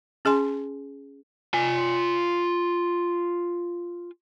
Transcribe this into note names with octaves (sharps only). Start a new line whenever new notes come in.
C#4 G#4 G#5 C6
F4 G#5